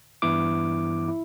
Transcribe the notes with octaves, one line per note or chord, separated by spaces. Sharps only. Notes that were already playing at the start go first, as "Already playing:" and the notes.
G2 E3 B3 E4 D6
E4